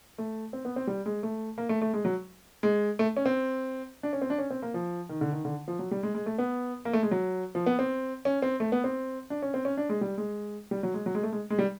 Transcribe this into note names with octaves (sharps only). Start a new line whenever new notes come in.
A3
C4
B3
C4
G3
G#3
A3
A#3
A3
A3
G#3
F#3
G#3
A3
C#4
C4
D4
C#4
C4
D4
C#4
C4
A#3
F3
D#3
D3
D#3
D3
F3
F#3
G3
G#3
G#3
A3
B3
A#3
A3
G#3
F#3
F3
B3
C4
C#4
C4
A3
B3
C4
D4
C#4
C4
C#4
D4
G#3
G3
G#3
G3
F#3
G#3
F#3
G#3
A3
G#3
G#3
G3